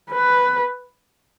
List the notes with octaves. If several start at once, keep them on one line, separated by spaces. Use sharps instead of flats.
B4